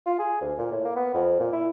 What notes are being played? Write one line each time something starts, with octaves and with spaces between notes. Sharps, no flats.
F4
G#4
D2
A#2
A2
A#3
B3
F2
A#2
E4